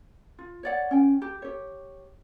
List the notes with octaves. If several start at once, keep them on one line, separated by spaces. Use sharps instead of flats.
F4
C#5 D5 F#5
C#4 G5
G4
G4 C#5